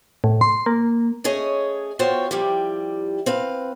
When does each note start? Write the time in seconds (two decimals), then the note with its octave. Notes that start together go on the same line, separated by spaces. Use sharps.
0.24 A2
0.41 C6
0.66 A#3
1.24 A3 C#4 G#4 C#5 D#5
1.99 B3 F4 F#4 C5 C#5 G5
2.31 F3 G3 E4 G4
3.26 C4 B4 F5